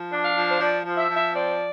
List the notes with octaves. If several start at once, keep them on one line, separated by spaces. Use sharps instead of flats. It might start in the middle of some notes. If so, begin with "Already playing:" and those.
Already playing: F3
D4
F5
F3
C5
F3 D5
F3
E5
F3
E5
C4 D5